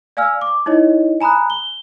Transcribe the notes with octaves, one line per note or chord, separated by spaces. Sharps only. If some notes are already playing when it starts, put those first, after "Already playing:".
D5 F5 G#5 E6 F6
D6
D#4 E4 C#5 D#5
G#5 A#5 B5 D#6 F#6
G7